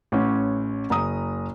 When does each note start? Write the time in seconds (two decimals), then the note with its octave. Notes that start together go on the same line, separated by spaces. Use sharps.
0.12 A1 C#4
0.90 F#1 A#5 D#6